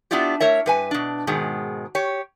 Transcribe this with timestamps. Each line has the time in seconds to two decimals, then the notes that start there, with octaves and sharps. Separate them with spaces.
0.11 B3 D4 E4 F4 G4
0.41 A3 A#4 C#5 E5
0.66 G2 B4 G#5
0.91 B2 D4
1.27 G#2 B2 D#3 G#3
1.95 G4 C#5